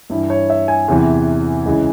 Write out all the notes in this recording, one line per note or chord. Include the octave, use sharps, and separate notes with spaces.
G2 E3 E4
C#5
E5
G#5
E2 C3 E3
C#2 C#3 E3